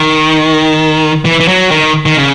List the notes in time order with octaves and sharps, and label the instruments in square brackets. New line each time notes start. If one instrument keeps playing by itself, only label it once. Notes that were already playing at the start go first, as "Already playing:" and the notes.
Already playing: [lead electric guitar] D#3
E3
E3
F#3
D#3
D#3
C#3